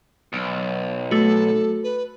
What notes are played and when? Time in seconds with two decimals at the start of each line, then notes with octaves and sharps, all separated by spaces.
0.33 B1
1.11 A3 F#4 A4
1.83 B4